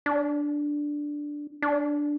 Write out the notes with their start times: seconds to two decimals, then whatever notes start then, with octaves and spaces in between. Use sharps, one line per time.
0.06 D4
1.62 D4